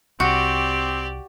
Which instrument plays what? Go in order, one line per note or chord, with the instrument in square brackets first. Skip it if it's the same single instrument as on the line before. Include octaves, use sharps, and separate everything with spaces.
[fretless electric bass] C2 [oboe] C4 [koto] F#4 [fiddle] G4 D5